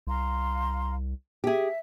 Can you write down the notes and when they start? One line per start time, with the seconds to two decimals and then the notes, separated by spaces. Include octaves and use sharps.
0.07 C2 F5 A#5 C6
1.44 G4 G#4 E5